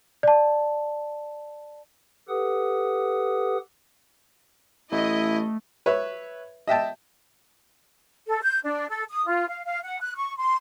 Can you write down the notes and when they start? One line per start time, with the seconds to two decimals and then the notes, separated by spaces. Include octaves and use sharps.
0.23 D5 A5
2.28 G4 A4 B4 F#5 D#6
4.92 A1 A3 E4 D#5
5.86 B4 C#5 E5
6.67 D#5 E5 G5 A5
8.27 A4
8.42 G6
8.64 D4
8.89 A4
9.10 D#6
9.26 F4
9.49 F5
9.66 F5
9.83 F#5
10.00 F#6
10.16 C#6
10.39 C6